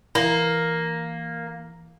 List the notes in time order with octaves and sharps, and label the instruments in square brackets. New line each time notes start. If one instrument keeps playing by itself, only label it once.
[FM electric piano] E3 A#5 [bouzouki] A#3